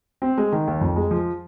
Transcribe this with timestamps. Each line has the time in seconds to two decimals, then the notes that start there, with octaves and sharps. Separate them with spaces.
0.22 C4
0.38 G#3
0.52 D#3
0.67 D#2
0.81 F2
0.96 G#3
1.11 F3